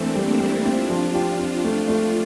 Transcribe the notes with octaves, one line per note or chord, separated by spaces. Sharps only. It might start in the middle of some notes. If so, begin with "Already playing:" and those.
Already playing: E3 A3 A#3 C4 D4
G3
C4 E4
G3
C4 D4 F4
F3
G4
C4
A3
A3